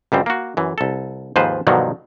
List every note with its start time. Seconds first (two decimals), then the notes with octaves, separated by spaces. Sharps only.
0.12 C#2 F#2 G3 C4
0.26 A#3 F#4
0.57 F#2 E3
0.78 C2 A4
1.36 D#2 G#2 F3 B4 C5
1.67 G2 B2 D3 D#3 F3 F#3